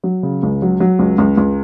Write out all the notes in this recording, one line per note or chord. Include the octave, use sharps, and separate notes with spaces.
F#3
C#3
C#2
F#3
F#3
C#2
C#2
C#2